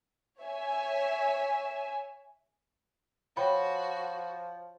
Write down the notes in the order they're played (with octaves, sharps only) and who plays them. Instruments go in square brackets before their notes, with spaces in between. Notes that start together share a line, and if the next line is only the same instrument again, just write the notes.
[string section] C#5 E5 G#5
[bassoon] F3 [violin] F#4 [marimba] C#5 G5 [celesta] B5